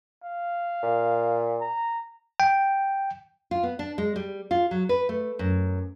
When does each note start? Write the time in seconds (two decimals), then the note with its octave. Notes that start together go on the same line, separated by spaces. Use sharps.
0.24 F5
0.83 A#2
1.61 A#5
2.40 G5
3.51 F4
3.63 B3
3.79 D4
3.98 G#3
4.16 G3
4.51 F4
4.71 F#3
4.89 B4
5.09 A3
5.39 F#2